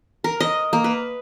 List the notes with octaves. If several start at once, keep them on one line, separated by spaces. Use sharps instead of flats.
A#4
D#5
A#3
B4